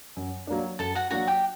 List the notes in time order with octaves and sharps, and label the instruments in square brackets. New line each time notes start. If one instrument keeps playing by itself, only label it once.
[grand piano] F#2
F#3 A#3 D4
[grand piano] F#2 [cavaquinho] A4 A5
[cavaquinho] F#4 F#5
[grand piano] F#3 A#3 D4 [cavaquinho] F#4 F#5
[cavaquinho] G4 G5